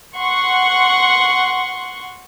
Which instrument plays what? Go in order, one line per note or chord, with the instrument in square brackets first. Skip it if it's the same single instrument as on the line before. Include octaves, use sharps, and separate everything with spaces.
[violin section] F#5 C6 C#6